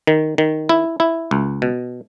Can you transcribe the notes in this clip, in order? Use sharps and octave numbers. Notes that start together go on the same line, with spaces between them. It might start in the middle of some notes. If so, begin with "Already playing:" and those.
D#3
D#3
E4
E4
C#2
B2